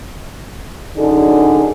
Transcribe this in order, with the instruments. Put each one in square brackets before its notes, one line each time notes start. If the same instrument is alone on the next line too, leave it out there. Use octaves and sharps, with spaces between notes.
[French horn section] F#2 D3 D4 D#4 G#4